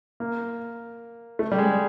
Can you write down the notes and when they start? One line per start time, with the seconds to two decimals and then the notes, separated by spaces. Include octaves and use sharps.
0.20 A#3
1.39 A3
1.52 G3
1.58 G#3